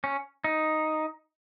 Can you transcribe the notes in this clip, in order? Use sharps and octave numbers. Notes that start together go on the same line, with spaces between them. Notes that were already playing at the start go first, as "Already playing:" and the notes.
C#4
D#4